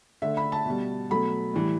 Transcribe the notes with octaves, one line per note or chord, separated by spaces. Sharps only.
D3 A3 E5
B5
A5
B2 G3
B2 F#3 A3 B5
A2 E3 G3